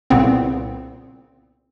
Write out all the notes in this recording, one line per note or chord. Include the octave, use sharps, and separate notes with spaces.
C2 A#2 C#3 B3 C4